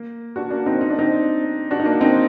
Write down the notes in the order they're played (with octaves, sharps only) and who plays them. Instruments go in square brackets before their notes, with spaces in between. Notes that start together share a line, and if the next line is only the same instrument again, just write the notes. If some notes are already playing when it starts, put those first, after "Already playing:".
Already playing: [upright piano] A#3
D4 F#4
A#3 D4
C4 D#4
D#4
D4
C4 D#4
D4 F#4
D#4
A#3 D4
C4 D#4